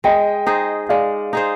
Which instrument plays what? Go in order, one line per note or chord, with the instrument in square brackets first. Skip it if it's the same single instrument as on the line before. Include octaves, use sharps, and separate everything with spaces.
[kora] G#3 [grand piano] D#5 G5
[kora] D#4 G#4 C5
[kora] G#3 [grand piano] D5 F5
[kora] D#4 G#4 C5